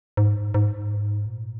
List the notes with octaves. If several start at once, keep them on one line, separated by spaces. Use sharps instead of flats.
G#2
G#2
A#2